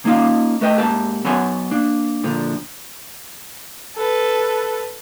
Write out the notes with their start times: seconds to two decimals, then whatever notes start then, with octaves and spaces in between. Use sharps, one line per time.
0.05 A#3 C#4 D#4 F4 F5
0.61 A3 B4 D#5 G5
0.77 G#2 A#3 G4 E5 A5
1.24 F#3 B3 C#5 F#5 G#5 C6
1.71 A#3 D4
2.24 A#2 D3 F3
3.96 A4 B4